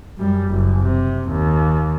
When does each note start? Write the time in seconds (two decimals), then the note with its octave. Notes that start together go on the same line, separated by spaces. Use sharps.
0.18 F#2 G3
0.50 F#1
0.82 C3
1.29 D#2